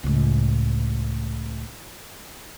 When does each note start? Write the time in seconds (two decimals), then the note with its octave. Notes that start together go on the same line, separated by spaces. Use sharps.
0.03 C#2 A2